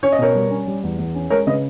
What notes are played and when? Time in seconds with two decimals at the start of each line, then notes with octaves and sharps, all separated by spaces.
0.03 C#4 C#5
0.12 D#5
0.19 B2 A#4 C#5
0.35 G3
0.50 C#4
0.67 G3
0.83 E2
0.99 E2
1.14 C#4
1.30 G#3 A#4 C#5
1.47 C#3 B4 D#5